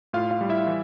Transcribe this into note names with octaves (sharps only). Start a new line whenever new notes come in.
A2 F4 F5
F4 F5
G3
E4 E5
E3